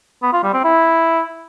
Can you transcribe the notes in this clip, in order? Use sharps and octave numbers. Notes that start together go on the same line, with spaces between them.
B3
F4
G3
C4
E4